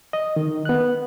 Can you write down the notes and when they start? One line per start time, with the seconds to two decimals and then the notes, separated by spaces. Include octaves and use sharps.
0.13 D#5
0.36 D#3
0.65 B3 F#6